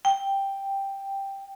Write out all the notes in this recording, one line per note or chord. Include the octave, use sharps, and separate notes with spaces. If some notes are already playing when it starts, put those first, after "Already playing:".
G5